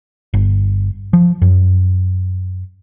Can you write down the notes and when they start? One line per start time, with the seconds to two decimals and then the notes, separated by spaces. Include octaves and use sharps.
0.34 G1
1.13 F3
1.42 F#2